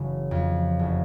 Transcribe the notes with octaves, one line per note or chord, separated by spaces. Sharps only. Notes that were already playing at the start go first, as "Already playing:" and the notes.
Already playing: F#1 C#3 E3
F2
F#1